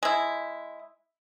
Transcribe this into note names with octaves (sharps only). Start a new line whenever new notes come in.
G#3 E4